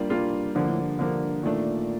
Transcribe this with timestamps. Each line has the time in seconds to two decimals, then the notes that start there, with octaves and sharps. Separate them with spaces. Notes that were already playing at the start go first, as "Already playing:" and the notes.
Already playing: G2 G3 A#3 D4 F4
0.10 G3 A#3 D4 F4
0.55 G2 D3 F3 A#3
0.68 A2
0.81 G2
0.99 D3 F3 A#3
1.43 A#2 D#3 A3 D4